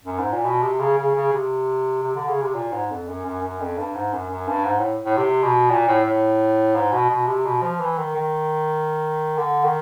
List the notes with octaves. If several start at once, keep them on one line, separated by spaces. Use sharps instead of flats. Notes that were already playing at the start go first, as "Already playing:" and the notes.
F#2
G#2
A#2
B2
C3
C#3
C#3
C#3
C3
C3
D3
C#3
C3
A#2
G#2
F2
F#2
F#2
F#2
F2
G2
G#2
F#2
F#2
G2
G#2
A2
A2
C3
B2
A#2
A2
A2
G#2
B2
B2
C3
B2
F3
E3
D#3
D#3
D3
D#3